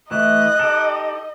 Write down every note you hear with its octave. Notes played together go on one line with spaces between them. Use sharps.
E3 A3 E4 D#5 F#6
D#4 G4 A4